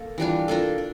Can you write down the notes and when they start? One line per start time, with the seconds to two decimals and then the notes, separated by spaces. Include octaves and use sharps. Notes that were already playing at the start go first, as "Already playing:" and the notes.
Already playing: A#3 A4
0.18 E3 G3 D4 F4
0.48 A#3 D4 F4 A4
0.78 D4